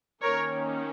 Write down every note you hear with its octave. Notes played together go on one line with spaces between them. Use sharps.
D#3 A#3 C#4 A#4 C#5